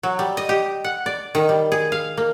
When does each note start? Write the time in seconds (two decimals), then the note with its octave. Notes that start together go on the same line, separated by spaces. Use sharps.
0.03 F#3
0.19 G3
0.37 D#5
0.49 G4
0.84 F#5
1.06 D5
1.35 D#3
1.49 G3
1.72 G#4
1.92 F5
2.17 A#3